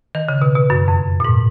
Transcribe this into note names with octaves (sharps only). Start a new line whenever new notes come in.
D#3
C#3
B2
B2
F#2
F2
A#2
G#2